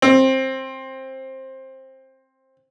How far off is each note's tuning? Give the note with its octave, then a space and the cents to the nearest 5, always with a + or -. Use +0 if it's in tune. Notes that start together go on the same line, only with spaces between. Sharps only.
C4 +15